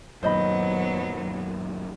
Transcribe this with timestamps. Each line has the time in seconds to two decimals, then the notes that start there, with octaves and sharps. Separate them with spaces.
0.23 F#2 A#2 D#3 F#3 B3 C5 D#5 B5